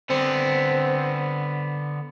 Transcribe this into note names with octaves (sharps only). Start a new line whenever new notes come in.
D3 B3 C4